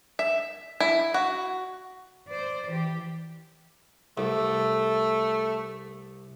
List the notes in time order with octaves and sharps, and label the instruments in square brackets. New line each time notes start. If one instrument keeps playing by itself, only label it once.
[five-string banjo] E5
E4
F#4
[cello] C5 D5
E3 G4
[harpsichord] C2 [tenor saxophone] A3